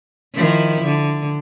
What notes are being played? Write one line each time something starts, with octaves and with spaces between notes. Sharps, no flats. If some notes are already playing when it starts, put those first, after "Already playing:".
D#3 F3 E4
D3